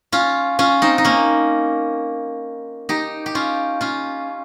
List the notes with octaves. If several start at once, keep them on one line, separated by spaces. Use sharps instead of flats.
C#4 F4
C#4 F4
C4 D#4
D#4
A#3 C#4
D#4 G4
G4
C#4 F4
C#4 F4